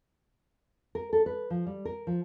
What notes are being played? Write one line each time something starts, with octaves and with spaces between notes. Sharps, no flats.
A#4
A4
B4
F3
G3
A#4
F3